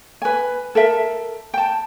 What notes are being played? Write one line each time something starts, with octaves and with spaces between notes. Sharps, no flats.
B4 G#5
A4 A#4 E5
G5 A5